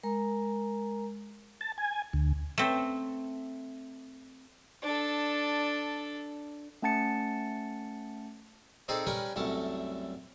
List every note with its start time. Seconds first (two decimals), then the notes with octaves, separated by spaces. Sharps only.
0.03 G#3 A#4 A#5
1.61 A5
1.78 G#5
2.13 D2
2.58 A3 C4
4.82 D4 A4
6.82 A3 C#4 F#5 A5 A6 C#7
8.88 C4 D#4 G#4 A4 D5
9.06 G3 C#4 A#4 B4 C#5
9.36 C2 F#2 A3 A5